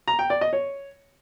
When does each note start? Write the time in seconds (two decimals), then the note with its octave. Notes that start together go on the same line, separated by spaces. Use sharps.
0.08 A#5
0.19 G5
0.30 D5
0.41 D#5
0.53 C#5